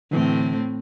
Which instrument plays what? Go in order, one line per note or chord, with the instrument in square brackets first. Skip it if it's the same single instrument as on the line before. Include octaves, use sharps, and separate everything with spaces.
[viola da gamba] A2 C4 [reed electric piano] D3 E3 A3